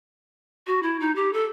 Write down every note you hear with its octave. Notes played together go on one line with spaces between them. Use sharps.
F#4
E4
D#4
G4
A4